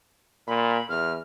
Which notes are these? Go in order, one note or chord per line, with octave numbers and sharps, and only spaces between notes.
A#2 B5
E2 F6